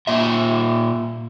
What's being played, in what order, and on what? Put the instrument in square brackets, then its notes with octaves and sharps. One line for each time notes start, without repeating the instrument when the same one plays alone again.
[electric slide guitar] A#2 E5